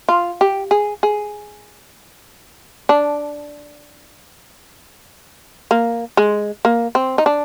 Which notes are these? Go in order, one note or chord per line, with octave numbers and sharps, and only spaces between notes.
F4
G4
G#4
G#4
D4
A#3
G#3
A#3
C4
D#4
D4